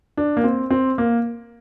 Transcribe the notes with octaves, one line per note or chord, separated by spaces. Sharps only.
D4
A#3
C4
C4
A#3